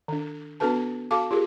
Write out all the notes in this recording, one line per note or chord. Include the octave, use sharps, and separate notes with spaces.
D#3 D4
B3 D4 F#4 A4 B4 A5
F#4 A4 F5 A5 D6
F4 G4 G#4 A#4